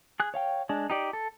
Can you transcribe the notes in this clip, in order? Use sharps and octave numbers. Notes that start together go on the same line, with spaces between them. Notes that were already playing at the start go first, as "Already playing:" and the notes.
G#4 F#6
C#5 F5 G5
G#3 D4
D#4 G4 D5
A4